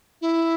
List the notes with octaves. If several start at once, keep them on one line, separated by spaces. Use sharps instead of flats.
E4